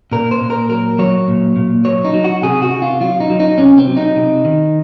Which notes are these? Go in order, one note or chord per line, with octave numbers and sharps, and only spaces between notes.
A#2 A#4
C5
A#2
A#4
F#3 A#4
F#3 C#5
A#2
A#2
F#3 C#5
D#4
F#3
F#4
C3 G#4
F#4
C3
F4
F#3 F4
D#4
F#3
D#4
C3 C#4
C4
F#3
D#4
C3
D#3